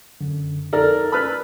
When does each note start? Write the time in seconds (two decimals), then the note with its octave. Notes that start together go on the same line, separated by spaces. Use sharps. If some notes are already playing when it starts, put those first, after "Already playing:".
0.21 F#2 D3
0.73 F2 D#4 A4 A#4 D5 F6
1.12 B4 B5 E6 F6 A6